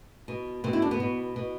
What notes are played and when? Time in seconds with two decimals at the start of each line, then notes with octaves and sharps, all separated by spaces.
0.28 B2
0.64 B2 C4
0.73 E4
0.82 D4
0.91 B3
1.00 B2
1.36 B2